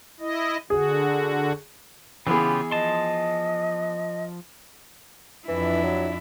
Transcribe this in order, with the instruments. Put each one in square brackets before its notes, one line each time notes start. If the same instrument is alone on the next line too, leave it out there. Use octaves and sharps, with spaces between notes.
[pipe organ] E4 D#5
[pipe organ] D3 F#4 [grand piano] G#4
[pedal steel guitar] C#3 F4 G4 [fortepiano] E3 B3 G#4 [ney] B5
[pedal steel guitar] F3 A5 C6 [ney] D#5
[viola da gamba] F2 D4 E4 [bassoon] E3
[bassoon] F#3